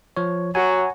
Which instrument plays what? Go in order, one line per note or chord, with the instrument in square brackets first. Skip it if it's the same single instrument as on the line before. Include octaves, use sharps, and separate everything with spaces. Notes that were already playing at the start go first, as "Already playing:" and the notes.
[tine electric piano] F3 C#5
[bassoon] F#3 [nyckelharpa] F#4 [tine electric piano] G#5